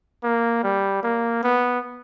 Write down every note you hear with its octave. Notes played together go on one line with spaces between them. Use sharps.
A#3
G3
A#3
B3